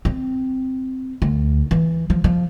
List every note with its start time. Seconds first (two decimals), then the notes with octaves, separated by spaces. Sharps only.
0.05 C4
1.22 D2
1.71 E3
2.10 F3
2.24 F3